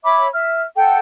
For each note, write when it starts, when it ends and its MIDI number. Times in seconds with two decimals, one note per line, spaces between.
0.04 0.27 73
0.04 0.27 76
0.04 0.27 83
0.04 0.27 86
0.33 0.64 76
0.33 0.64 89
0.75 0.98 69
0.75 0.98 78
0.75 0.98 79